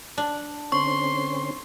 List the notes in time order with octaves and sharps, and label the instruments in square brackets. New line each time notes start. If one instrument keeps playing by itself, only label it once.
[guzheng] D4
[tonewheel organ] D3 C4 C#4 [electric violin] C6 [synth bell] C#6